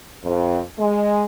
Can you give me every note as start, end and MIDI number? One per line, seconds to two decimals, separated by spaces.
0.24 0.59 41
0.79 1.24 56